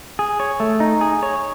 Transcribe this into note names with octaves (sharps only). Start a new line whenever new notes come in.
G#4
C#5
A3
D#4
G#4
C#5